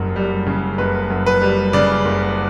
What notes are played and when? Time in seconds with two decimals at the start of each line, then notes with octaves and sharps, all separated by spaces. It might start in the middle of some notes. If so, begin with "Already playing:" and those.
Already playing: F#1 F#2 C#3 G3
0.16 G3
0.46 C#3
0.78 F#1 B4
1.10 F#2
1.26 B4
1.42 G3
1.73 C#3 D5
2.05 F#1